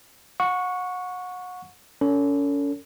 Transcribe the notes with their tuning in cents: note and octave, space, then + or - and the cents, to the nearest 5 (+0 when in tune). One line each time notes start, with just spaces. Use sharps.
F#5 -30 C#6 +0
C#4 +35 A4 +40